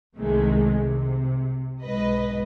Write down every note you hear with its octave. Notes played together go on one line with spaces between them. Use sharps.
C2 C3 D#3 G#3 A3
C3
B1 G#2 B4 D#5